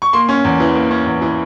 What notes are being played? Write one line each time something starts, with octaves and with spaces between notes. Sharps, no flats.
C#6
A#3 C6
C#4
E2
E3
A#3
C#4
E2
E3